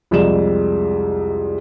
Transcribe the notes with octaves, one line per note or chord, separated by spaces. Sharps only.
C2 F2 C3 G#3 D5 E7